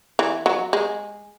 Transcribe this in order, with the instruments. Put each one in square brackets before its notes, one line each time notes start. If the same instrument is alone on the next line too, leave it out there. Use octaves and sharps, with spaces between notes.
[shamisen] E3
F#3
G#3